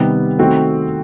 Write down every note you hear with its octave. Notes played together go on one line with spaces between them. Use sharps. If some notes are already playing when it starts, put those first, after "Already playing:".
Already playing: C3 D#3 G3 B3
D#3 A3 C4 F#4